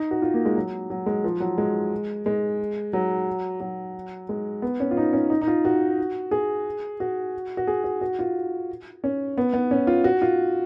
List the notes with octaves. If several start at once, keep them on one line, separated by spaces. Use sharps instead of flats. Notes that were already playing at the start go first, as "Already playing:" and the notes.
Already playing: D#4
F#4
F4
A#3
G#3
F#3
F#3
G#3
F3
F#3
G#3
G#3
F#3
F#3
G#3
B3
C#4
F4
D#4
C#4
D#4
D#4
F4
F#4
G#4
F#4
F#4
G#4
F#4
F#4
F4
C#4
B3
B3
C#4
F4
F#4
F4